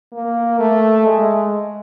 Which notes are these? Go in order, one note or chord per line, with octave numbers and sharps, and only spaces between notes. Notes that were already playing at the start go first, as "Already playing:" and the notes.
A#3
A3
G#3